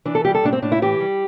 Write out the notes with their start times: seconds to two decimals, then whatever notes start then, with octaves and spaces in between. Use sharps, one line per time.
0.05 E3 D4
0.15 A4
0.25 G3 G4
0.35 A4
0.43 A2 D4
0.53 C4
0.62 A2 D4
0.72 E4
0.82 E3 G4
1.01 G3